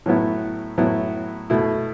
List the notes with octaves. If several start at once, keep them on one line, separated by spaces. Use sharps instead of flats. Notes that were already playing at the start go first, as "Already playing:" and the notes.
A2 F#3 B3 E4
A2 F#3 B3 E4
B2 A3 E4